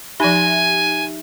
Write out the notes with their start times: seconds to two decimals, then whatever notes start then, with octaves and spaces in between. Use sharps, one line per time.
0.20 F3 D#4 G4 E5 G#5 B5